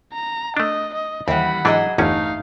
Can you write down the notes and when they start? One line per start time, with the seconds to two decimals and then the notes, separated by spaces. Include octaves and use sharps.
0.13 A#5
0.57 A3 D4 D#5
0.94 D#5
1.28 D#2 E3 G3 F#5 B5
1.65 G#2 E3 F#3 D4 G#4 D#5
1.98 G1 E2 A3 C#4 D#4 F5